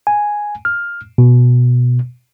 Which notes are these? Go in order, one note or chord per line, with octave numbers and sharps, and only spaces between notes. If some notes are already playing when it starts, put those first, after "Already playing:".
G#5
F6
B2